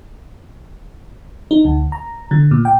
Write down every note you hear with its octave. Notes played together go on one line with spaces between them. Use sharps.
D#4
D2
A#5
D3
A#2
G5